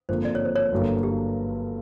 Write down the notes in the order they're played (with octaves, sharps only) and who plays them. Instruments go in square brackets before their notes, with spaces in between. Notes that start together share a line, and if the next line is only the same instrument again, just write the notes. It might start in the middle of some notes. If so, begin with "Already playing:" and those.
[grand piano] G#1 G2 D3 F3 A#3 [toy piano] C5
[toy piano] D5
C#5
C5
C#5
[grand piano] G1 G2 D3 F#3 A#3
[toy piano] G4